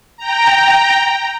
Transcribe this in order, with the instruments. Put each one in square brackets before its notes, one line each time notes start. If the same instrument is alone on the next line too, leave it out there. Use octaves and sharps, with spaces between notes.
[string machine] G5 A#5